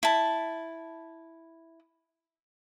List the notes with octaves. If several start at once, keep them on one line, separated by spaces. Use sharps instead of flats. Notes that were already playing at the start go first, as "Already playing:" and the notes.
E4 A5